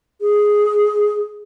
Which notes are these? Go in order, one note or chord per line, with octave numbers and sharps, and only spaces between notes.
G#4